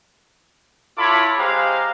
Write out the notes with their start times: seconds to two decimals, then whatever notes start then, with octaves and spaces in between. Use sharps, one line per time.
0.98 E4 F4 A4 C#5 B5 D6
1.38 G#3 G4 C5 F5 A#5